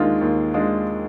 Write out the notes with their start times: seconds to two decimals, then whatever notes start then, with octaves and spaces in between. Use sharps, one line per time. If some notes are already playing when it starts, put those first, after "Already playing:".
Already playing: D#2 D#3 G#3 D4 F4
0.21 D#2
0.54 G#3 D4 F4